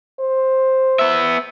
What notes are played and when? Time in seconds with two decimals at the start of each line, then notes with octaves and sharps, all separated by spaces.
0.20 C5
0.99 B3 E5